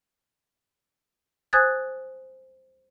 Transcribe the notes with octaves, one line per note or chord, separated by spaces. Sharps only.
C5 G#5 D#6 F#6 G#6 A6